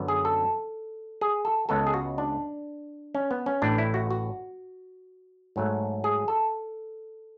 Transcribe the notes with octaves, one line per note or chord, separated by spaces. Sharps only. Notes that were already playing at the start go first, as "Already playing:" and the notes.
Already playing: F#2 D3 F#3 B3
G#4
A4
G#4
A4
C#2 C#3 G#3 B3 A4
G#4
F#4
D4
C#4
B3
C#4
A1 A2 E3 D4
E4
F#4
F#4
G#2 F#3 A3
G#4
A4